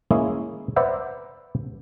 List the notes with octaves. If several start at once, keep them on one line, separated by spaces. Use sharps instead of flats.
G#3 A#3 C#4 E4 G#4
B4 C5 D5 E5 F#5 A#5